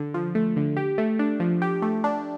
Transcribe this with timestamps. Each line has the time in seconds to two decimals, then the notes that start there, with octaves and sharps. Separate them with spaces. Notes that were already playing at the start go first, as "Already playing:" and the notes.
Already playing: D3
0.14 F3
0.35 A3
0.56 D3
0.77 G4
0.98 A3
1.19 D4
1.40 F3
1.62 G4
1.82 A3
2.04 D4